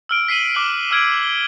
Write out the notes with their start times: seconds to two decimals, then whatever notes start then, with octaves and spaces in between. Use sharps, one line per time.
0.09 E6 F6 D7
0.28 B6 C7 D#7 F#7
0.55 D6 F#6 D7 F#7
0.91 E6 F6 G#6 D7
1.23 G7